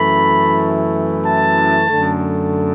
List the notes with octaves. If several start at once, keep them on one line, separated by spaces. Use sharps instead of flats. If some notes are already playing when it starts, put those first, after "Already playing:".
Already playing: F#2 E3 A3 E4 B5
A5
F#2 D3 A3